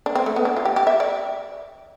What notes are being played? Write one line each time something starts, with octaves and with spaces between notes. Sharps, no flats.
D4
C4
A3
B3
D4
F4
G4
G4
E5
D5